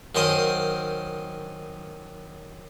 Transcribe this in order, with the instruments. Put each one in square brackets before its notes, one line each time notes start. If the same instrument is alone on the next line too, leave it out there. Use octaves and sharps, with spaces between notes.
[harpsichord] F#2 D#3 C5 D#5 D#6